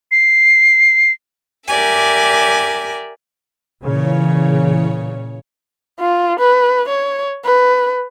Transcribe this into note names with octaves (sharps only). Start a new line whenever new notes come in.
C7
G4 A#4 D5 E5 G#5
A#2 C#3 E3 C#5
F4
B4
C#5
B4